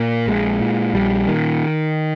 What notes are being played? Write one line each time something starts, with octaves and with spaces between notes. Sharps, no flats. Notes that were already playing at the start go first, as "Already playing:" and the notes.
Already playing: A#2 A#3
A#1 G#3
A#2
A#1 G3
A#2 D#3